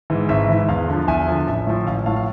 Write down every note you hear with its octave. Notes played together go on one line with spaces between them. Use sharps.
G#2 E3
G#1 E5
G#2 E3
E2 F5
D3 F3
E2 E5 G#5
D3 F3
A1 E5
A2 F3
A1 F5
A2 F3 F5 A5
F5